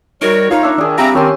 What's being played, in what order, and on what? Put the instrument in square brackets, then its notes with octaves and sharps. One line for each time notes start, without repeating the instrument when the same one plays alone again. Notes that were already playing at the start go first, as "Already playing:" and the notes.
[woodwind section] G3 F#4 C#5 [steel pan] D#4 [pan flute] A#4
[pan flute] D#4 [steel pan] F4 A#4 [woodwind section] C#5 F5
[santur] D4 E5
[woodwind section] D#3 [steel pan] D4 [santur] G#4 D5
[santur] G3 [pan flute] C4 [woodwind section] E5 A#5 [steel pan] F5
[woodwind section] D#3 [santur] C#4 A5 C6 [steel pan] G4 G#5